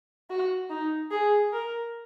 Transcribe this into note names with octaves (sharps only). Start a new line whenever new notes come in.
F#4
D#4
G#4
A#4